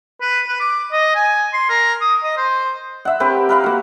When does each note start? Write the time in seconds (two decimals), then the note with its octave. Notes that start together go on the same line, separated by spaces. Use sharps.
0.21 B4
0.48 B4
0.60 D6
0.92 D#5
1.15 G#5
1.54 C6
1.69 A#4
2.01 D#6
2.23 D#5
2.37 C5
3.05 E5 F#5
3.20 C4 G4 A#4 B4
3.49 A#4 B4 F5
3.64 A#3 F#4